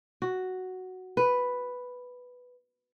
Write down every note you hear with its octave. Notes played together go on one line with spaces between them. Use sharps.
F#4
B4